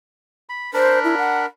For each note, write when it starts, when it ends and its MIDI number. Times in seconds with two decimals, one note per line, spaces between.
0.49 0.71 83
0.74 1.46 62
0.74 1.46 70
0.74 0.99 72
0.74 1.46 83
1.04 1.15 64
1.18 1.41 78